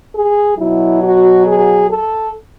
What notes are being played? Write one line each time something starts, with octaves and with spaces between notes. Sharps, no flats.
G#4
B2 F#3 E4
F#4
G#4
A4